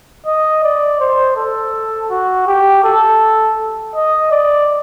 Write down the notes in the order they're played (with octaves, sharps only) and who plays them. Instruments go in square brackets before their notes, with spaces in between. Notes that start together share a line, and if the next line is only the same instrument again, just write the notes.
[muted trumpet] D#5
D5
C5
A4
F#4
G4
A4
D#5
D5